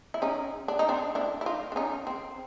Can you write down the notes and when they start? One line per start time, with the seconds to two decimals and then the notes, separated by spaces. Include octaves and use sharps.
0.14 E4
0.22 C#4 D#4
0.68 D4
0.79 D#4
0.89 C4 D4
1.15 D4 E4
1.41 E4
1.46 D#4 F4
1.72 D4
1.76 C#4 D#4
2.07 C4